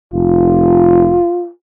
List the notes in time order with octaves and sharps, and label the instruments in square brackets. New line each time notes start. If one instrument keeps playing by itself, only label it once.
[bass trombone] F1 [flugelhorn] F4